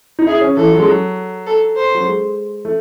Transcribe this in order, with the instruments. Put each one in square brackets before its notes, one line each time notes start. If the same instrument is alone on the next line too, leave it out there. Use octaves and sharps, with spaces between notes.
[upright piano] D#4
[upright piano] E4 [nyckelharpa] G#4
[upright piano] C#4
[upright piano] E3 [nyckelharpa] A4
[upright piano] F#3
G#3
F#3
[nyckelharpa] A4
C5
[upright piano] F#3
G#3
A3